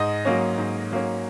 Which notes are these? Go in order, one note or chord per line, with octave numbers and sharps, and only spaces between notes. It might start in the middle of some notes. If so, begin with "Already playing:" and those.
Already playing: G#2 D#5
F#3 A#3 C#4
G#2
F#3 A#3 C#4